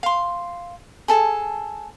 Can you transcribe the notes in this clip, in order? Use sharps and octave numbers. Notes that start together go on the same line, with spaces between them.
F5 C6
G#4 A4 A5